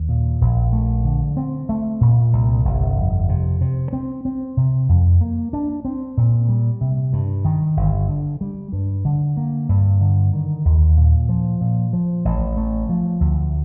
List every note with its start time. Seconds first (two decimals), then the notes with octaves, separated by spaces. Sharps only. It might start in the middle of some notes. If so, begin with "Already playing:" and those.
Already playing: D#2
0.09 A#2
0.41 A#1
0.73 A3
1.05 D3
1.37 C4
1.69 A3
2.01 A#2
2.33 C2
2.65 G1
2.97 F2
3.29 C3
3.61 C3
3.93 C4
4.25 C4
4.57 C3
4.89 F2
5.21 A#3
5.53 D4
5.85 C4
6.17 A#2
6.49 G3
6.81 C3
7.13 G2
7.45 D#3
7.77 G1
8.09 D3
8.41 G3
8.73 G2
9.05 D3
9.37 A#3
9.69 G2
10.01 D3
10.33 D#3
10.65 D#2
10.97 A#2
11.29 F3
11.61 A#2
11.93 F3
12.25 A1
12.57 A3
12.89 F3
13.20 D2